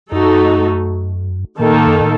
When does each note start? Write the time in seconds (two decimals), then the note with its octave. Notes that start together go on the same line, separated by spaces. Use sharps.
0.12 F#2 A3 D#4 F#4 A4
1.59 A#2 D#3 A#3 D#4 A4
1.73 A2
1.87 F#2
2.00 A2